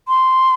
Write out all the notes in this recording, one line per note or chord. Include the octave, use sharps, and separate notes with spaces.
C6